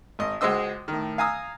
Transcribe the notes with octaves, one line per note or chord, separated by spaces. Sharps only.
G#1 D#5
C#2 G#3 F#4 C5 D#5 E6
A2 D#3
F5 G#5 A#5 D#6 E6